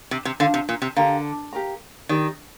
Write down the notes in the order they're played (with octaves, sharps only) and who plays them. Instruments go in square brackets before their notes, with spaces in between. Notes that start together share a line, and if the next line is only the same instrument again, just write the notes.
[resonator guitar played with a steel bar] C3
C3
[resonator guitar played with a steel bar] D3 [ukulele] F4 C5 F5
[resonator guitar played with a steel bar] C3
A#2
C3
[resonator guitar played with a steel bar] D3 [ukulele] G4 A#4 F5 A#5
[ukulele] G4 A#4 F5 A#5
[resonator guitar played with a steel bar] D#3 [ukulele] D#4 G4 D5